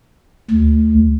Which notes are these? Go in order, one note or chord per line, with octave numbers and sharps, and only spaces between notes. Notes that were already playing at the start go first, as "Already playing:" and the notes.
D2